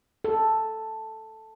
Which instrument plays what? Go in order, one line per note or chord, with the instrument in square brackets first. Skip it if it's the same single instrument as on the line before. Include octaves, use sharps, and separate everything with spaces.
[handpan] A4